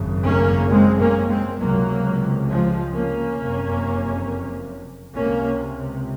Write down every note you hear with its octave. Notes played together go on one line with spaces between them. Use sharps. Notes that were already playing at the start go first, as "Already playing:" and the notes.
Already playing: G#1 F#2 C#3
A#3 C#4
G#3 C4
A#3 C#4
G#3 C4
C#2 C3 F#3 A#3
F3 G#3
A#3 C#4
F#1 F2 C3
C#2 C3 A#3 C#4